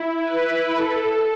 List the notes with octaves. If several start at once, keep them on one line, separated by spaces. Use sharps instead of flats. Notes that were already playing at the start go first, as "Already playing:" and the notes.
Already playing: E4
B4
A4